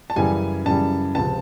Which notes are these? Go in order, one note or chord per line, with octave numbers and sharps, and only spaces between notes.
A5
F#2 C#3 E3 G3 G#5
F#2 C#3 E3 G3 A5
C#2 C3 F3 A5